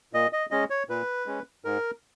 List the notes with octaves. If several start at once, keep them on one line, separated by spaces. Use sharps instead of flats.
A#2 D#5
D#5
G#3 C#4 D#5
C#5
A#2 B4
G#3 C#4
G#2 A#4